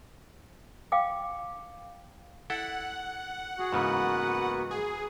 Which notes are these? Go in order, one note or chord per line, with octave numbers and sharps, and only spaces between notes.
F5 G5 D6
E4 A4 F#5
F#4 G#4
G#2 C#3 E3 A#3 B3 B4
G#4